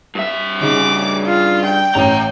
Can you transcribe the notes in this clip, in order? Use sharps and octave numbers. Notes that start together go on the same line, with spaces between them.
G2 E5
C#3 D#4 G#4 D6
F4
G5
A1 E5 A#5